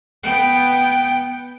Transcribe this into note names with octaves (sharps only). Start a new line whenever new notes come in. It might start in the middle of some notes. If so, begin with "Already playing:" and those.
B3 G5